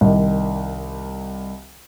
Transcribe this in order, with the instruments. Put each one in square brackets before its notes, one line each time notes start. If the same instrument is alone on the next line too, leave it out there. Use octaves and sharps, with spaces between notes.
[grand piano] C2 D#3